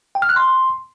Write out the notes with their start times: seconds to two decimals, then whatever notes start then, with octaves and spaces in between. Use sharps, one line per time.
0.15 G5
0.22 F6
0.29 F#6
0.36 C6